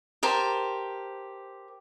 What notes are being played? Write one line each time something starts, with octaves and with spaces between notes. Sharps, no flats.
G4 A#4 C5 A5